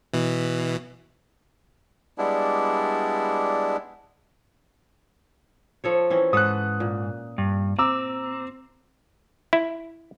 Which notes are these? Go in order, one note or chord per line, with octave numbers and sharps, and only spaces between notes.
B2 E3
G3 G#3 B3 D4 E4
F3 A4 C#5
E3 C4 C#4
G#2 A4 B4 D#6 F#6
A#2
G2
C4 A#5 D6 E6
E4